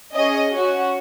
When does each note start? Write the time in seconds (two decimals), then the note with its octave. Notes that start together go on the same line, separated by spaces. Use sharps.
0.14 C#4 G#4 D#5
0.51 C#4 F#4